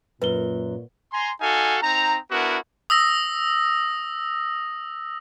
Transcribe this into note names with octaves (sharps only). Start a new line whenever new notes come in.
F#2 A#2 B4 G7
G#5 A#5 C6
D#4 F#4 A4 F5 G#5
C4 D#4 A#5
B3 D4 E4 F#4 A#4
D#6 E6 A#6